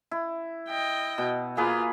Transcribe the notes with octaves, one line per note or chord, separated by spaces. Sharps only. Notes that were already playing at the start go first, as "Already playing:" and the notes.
E4
D#5 G5
B2
A#3 F4 G#4 B4